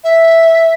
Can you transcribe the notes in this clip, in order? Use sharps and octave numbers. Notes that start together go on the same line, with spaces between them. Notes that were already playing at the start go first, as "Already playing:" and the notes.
E5